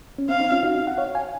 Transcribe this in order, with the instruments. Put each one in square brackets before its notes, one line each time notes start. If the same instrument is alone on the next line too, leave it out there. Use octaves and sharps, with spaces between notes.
[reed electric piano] C#4
[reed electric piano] C4 [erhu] F5
[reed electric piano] C4 D#4
C#4 F4
D#4 F#4
F#5
C#5 F5
F5 G#5